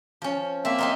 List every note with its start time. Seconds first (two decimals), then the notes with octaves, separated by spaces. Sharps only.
0.22 F3 C#4
0.65 A#3 C4 E5
0.78 C4 D#4 F4